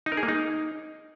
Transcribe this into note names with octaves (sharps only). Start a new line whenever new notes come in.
D#4
A#4
G#4
A#3
D#4